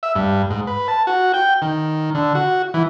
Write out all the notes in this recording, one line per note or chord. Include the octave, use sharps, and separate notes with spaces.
E5
G2
G#2
B4
A5
F#4
G5
D#3
D3
F#4
E3